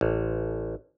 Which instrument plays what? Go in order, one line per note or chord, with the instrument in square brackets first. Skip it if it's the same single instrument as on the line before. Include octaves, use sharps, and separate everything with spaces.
[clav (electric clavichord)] A1